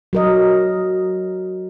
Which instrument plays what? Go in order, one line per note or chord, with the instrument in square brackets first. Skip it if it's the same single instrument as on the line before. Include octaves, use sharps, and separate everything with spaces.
[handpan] F#3 A#4 D#5